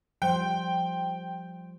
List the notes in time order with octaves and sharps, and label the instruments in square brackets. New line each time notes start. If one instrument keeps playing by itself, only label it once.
[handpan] F3 G3 C5 [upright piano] G5